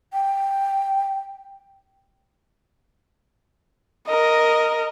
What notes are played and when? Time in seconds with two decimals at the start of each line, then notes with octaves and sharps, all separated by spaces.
0.13 G5
4.08 A#4 D#5